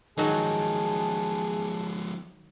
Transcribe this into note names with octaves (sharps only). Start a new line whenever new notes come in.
D#3 F3 F#3 G#3 G#4 A5